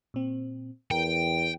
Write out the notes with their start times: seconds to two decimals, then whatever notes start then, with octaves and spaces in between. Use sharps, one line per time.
0.14 A#2 C4
0.91 E2 A#4 G5